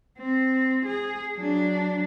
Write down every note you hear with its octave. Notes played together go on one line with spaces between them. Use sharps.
C4
G#4
F#3 D4